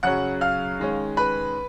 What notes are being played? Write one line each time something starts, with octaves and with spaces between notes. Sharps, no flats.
F#2 C#3 F#3 C#4 F#5 F#6
F5 F6
D#3 G#3 C#4
B4 B5